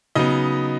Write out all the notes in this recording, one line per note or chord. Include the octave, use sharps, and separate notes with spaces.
C#3 F#3 B3 D#4 D#5